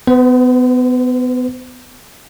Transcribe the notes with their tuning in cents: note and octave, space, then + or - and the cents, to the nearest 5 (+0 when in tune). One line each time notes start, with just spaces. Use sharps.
B3 +25 C5 -30